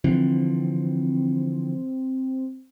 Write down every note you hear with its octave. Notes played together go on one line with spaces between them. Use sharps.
D3 E3 F3 C4